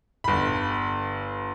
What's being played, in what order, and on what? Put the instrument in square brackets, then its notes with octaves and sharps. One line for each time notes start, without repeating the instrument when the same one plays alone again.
[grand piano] G1 B5